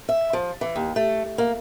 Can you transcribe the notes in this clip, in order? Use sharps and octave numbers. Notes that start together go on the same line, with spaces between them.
E5
F3
E3
D#2
A3
A#3